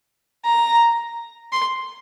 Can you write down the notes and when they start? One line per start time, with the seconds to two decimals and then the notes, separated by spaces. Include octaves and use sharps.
0.45 A#5
1.52 C6